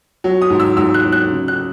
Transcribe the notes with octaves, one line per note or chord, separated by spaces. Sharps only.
F#3
D#6
G#2
E6
G#2 E6
F#6
F#3
F#6
C#3
F#6